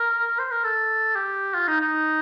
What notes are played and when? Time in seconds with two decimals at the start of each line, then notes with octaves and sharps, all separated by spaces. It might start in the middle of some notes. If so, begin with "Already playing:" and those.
Already playing: A#4
0.39 C5
0.51 A#4
0.64 A4
1.16 G4
1.54 F4
1.68 D#4
1.80 D#4